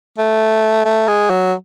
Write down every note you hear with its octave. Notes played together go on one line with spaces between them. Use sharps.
A3
A3
G#3
F#3